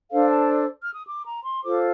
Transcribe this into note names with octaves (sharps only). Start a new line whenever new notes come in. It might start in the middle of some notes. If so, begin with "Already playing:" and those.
D4 A4 C5 F5
A5
F6
D#6
D6
A#5
C6
F4 A4 C5 D6